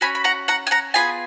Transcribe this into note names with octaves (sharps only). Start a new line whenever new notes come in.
C#4 F#4 G#5 B5
B5
F#5 A#5
F#5 A#5
G#5
F#5 A#5
B3 F4 G#4 G#5 B5